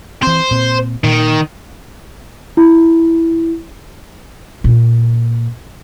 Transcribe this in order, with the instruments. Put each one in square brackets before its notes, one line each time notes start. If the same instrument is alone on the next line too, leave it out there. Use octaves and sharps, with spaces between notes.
[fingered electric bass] E3 C4 [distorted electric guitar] C5
[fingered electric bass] A#2 C4
[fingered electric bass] A#2 [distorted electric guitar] D#3
[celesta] E4
[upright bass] A#2